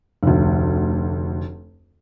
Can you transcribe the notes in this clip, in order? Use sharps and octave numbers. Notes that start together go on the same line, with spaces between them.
F1 D2